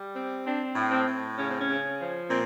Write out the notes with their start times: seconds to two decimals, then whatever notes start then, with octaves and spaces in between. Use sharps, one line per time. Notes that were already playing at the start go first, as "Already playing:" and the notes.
Already playing: G3
0.14 C4
0.46 C4 D4
0.76 A2
0.91 C4
1.07 A2
1.37 C#3 C#4
1.49 C4
1.59 C#4
1.69 C#3
1.99 F3
2.30 A#2 C4